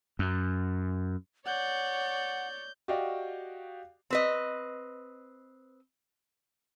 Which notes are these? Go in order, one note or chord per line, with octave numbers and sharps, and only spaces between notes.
F#2
C#5 D5 F#5 G6
F#4 G4 D5 D#5 F5 G5
C4 B4 D#5